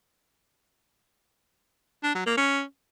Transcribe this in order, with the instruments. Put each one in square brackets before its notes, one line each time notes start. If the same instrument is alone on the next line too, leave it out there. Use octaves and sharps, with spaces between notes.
[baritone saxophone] D4
F#3
A#3
C#4